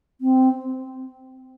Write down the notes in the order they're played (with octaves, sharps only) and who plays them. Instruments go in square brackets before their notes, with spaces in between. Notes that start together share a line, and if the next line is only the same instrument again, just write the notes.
[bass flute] C4